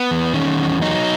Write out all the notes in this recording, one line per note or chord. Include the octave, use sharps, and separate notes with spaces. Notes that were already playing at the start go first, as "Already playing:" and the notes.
Already playing: B3
E2
D#3 C#4
E2
F#3 D#4